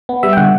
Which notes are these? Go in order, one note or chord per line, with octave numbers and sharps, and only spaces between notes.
B3
G3 E5
G5
D3 F#5